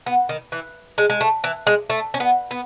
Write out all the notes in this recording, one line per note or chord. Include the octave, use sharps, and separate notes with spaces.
B3
D#3
E3
G#3
G#3
A3
E3
G#3
A3
C#4
B3
B3